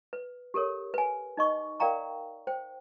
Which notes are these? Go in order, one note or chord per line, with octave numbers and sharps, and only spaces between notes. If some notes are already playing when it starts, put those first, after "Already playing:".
B4
G4 A4 A#4 C#5
B4 G#5
D#4 D#5 C#6 D6
A#4 D5 F5 G5 A#5 C#6
C5 G5